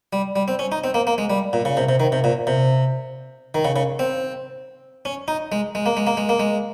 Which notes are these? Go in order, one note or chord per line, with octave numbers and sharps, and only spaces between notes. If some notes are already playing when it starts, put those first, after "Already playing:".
G3
G3
C4
C#4
D#4
C4
A#3
A#3
G#3
G3
A#2
C#3
C3
C3
D#3
C3
A#2
C3
D#3
C#3
C#3
C4
C#4
D#4
G#3
G#3
A#3
G#3
A#3
G#3
A#3
G#3